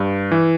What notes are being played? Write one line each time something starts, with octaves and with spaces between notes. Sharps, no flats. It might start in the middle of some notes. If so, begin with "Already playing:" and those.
Already playing: G2
E3